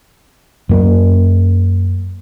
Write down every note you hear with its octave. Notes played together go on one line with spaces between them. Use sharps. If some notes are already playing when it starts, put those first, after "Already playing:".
F#2 A#3